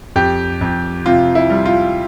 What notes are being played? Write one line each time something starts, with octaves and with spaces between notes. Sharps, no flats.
F2 G4
F2
C3 F4
E4
G3
F4